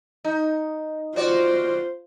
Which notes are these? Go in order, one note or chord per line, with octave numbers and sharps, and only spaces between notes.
D#4
F4 F#4 C5 D5